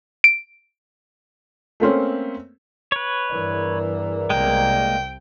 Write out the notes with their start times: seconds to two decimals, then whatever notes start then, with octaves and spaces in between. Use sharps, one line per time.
0.24 D7
1.80 A3 A#3 C4 C#4
2.92 B4 C#5
3.31 E2 G2 E3 A#4 D5
4.30 C2 C3 G#3 A#3 G5